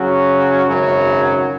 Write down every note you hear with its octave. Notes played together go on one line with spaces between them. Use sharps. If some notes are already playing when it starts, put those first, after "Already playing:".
Already playing: C#3 F#3 C#4 F#4
G#1 F#2 C#3 F#3